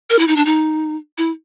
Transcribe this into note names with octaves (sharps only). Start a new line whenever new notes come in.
A#4
E4
D#4
D4
D#4
E4